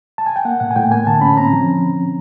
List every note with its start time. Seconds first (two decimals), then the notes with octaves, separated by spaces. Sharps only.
0.18 A5
0.26 G#5
0.36 G5
0.45 A#3 F#5
0.60 A2 F#5
0.71 G#5
0.76 A2 G5
0.91 A#3 G#5
1.07 D3 A5
1.21 C#4 B5
1.37 C4 A#5
1.53 F3